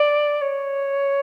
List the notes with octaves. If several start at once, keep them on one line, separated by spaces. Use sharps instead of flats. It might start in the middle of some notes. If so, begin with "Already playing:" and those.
Already playing: D5
C#5